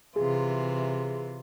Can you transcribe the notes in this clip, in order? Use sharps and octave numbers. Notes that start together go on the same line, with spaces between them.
C3 E3 F4 G#4